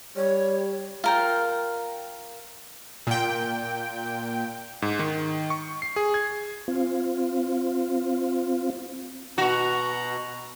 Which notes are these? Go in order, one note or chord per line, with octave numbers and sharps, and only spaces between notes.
G3 C#5
F4 A#4 G5
A#2 G5
G#2
D#3
C#6
C7
G#4
G#6
C4 F4
B2 F#4 A#5